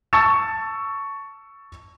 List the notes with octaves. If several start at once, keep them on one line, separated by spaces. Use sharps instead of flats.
A5 C#6 E6 A6 C#7 E7